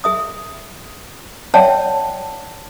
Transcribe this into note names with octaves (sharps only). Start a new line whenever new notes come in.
G#4 E5 D#6
C#5 D5 E5 F#5 G5 A5